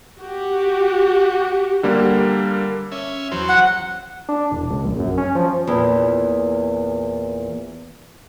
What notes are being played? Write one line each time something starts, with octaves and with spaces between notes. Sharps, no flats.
F#4 G4
D3 G3 A#3
C#4 E5
E2 F#3 C5
F#5
D4
E1
C#2
A#1
F#2
C#4
F3
E2 A#2